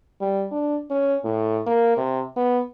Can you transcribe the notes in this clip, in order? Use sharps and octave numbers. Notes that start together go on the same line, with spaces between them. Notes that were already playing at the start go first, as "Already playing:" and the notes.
G3
D4
C#4
A2
A#3
C3
B3